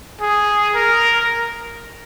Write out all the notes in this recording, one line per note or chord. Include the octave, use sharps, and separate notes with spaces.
G#4
A#4